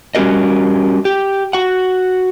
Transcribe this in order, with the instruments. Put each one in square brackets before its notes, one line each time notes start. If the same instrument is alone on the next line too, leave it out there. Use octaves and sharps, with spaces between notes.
[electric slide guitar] G3 C#4 F#4 G4 A#4 D#5
G4
F#4 F#5